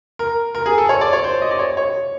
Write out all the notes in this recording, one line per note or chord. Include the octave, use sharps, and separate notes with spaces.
A#4
A#4
G#4
A4
C#5
D5
C#5
C5
D#5
D5
C#5
C#5